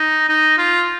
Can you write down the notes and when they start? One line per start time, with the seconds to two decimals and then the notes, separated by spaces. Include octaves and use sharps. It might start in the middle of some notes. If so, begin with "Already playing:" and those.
Already playing: D#4
0.29 D#4
0.58 F4